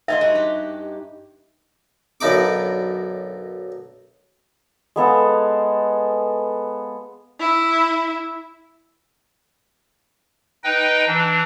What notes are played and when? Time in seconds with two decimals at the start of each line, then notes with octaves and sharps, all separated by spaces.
0.08 D#4 D#5 E5 G#5 C6
0.21 G2 F#4
0.35 G4
2.21 B1 F#2 D3 D#4 B5 D6
4.96 G#3 B3 A4 F5
7.39 E4
10.64 D#4 B4 D#5 G5
11.07 E3 D4